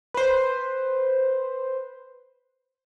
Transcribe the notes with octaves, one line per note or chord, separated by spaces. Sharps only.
B4 C5